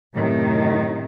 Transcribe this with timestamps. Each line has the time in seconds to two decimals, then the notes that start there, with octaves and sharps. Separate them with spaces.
0.14 F#2 A2 C3 D#3